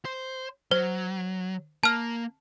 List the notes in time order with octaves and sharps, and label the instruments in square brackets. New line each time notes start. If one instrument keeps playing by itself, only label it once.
[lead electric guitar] C5
[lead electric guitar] F#3 [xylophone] C5
[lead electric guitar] A#3 [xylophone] A5 F6